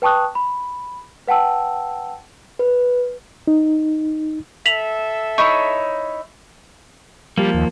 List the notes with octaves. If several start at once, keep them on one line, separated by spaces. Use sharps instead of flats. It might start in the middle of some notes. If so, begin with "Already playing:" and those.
B4 G5 A5 C#6 D#6 F#6
B5
B4 F#5 G5 A5 E6
B4
D#4
A4 E5 B6 F7 F#7
D#4 E4 C#5 C#6
F3 G3 A#3
D#2